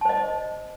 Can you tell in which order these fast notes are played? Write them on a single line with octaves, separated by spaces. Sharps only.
A5 C5 D#5